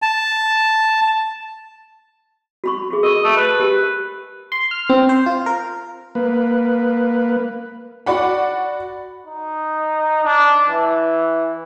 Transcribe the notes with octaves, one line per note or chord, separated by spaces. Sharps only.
A5
F#4 B5 C#6
F#4 G#4
A#4 D#5 C#6
A3
B4
G4 A#4
C6
F6
C4
C5
F4
A#4
A#3 B4
F#4 D5 F#5 B5
D#4
D4
E3